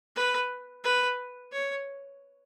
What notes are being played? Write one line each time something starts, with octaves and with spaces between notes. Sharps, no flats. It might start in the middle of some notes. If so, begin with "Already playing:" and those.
B4
B4
C#5